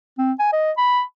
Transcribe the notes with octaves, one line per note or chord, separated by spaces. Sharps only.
C4
G#5
D#5
B5